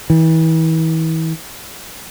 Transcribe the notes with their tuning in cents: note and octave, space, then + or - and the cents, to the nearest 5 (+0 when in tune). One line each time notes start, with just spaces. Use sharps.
E3 -35